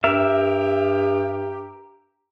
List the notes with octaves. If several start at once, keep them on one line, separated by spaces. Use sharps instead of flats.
G2 G4 A#4 E5